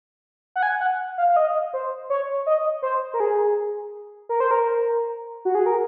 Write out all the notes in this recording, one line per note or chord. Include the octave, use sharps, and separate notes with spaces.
F#5
G#5
F#5
F5
F5
D#5
C5
C#5
D#5
C5
A#4
G#4
A#4
C5
A#4
F#4
G#4
A#4